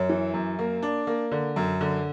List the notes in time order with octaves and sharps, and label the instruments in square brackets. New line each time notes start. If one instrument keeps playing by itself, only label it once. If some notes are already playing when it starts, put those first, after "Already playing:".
Already playing: [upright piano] F#2 [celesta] C#5
[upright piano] E3
F#2
A#3
D4
A#3
[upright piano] D3 [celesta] D5
[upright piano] F#2
D3